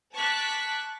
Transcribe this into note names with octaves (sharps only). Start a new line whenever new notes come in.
A5 C#6 D6 F#6 B6